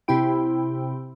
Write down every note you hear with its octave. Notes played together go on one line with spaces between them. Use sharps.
C3 C4 E4 G5